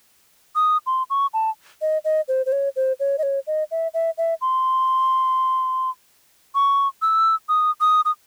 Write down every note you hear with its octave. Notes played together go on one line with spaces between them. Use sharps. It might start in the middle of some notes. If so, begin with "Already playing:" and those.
D#6
C6
C#6
A5
D#5
D#5
C5
C5
C#5
C5
C#5
D#5
C#5
D#5
E5
E5
E5
C6
C#6
E6
D#6
D#6
D#6